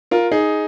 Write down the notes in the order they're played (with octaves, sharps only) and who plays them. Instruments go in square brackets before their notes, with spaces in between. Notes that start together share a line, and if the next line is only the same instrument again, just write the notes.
[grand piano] F4 A#4
D#4 G#4